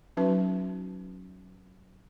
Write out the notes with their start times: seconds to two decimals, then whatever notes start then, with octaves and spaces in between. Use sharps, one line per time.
0.17 F#3 C#4 D#4 F#4 B4 A5